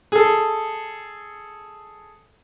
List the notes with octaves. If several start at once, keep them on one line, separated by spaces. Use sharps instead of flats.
G#4 A4